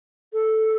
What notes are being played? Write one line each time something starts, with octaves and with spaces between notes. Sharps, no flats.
A4